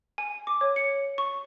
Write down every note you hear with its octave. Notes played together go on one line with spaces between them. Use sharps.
G#5
D6
C#5
C#7
C#6